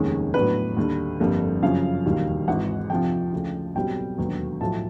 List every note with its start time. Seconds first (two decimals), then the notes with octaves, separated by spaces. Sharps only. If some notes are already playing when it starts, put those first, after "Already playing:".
Already playing: F1 D#2 D#3 G#3 C#4
0.34 A2 F#3 B3 D4 B4
0.77 D#2 D3 G3
1.20 G1 F2 D3 G3 A#3
1.62 F#2 C#3 F3 F5
2.05 E1 D#2 D#3 G3
2.48 G#1 G#2 E3 F#5
2.90 F2 C3 F3 G5
3.33 D2 C#3 F3
3.75 B1 B2 G3 C4 G5
4.18 E1 D#2 D3 F#3 B3
4.61 B1 A2 F3 A3 A5